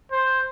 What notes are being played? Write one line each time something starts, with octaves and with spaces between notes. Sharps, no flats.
C5